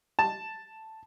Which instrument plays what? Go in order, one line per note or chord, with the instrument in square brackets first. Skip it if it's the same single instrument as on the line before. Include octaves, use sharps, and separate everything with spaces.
[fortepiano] A5